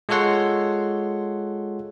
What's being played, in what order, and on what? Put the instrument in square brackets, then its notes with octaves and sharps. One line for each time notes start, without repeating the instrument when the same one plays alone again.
[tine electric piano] G#3 F4 A4 C#5 F#5 C6